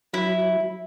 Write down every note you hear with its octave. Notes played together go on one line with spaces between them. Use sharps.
F#3 E4